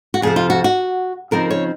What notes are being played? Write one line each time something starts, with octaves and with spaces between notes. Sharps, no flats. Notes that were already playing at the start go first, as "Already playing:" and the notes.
F#4
F2 C3 F3 G#4
F4
F#4
F#4
C#3 F3 C4 D#4 A#4
C#5